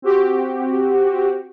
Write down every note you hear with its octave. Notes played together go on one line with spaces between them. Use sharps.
C4 F#4 G4